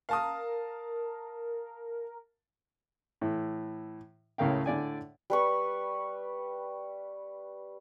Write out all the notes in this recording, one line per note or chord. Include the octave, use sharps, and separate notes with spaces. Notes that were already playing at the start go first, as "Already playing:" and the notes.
A#4 F5 A5 D#6
A2 E3
C#2 A2 C#3 A#4 F5 G5
A2 D3 D5 G#5
G3 B4 C#6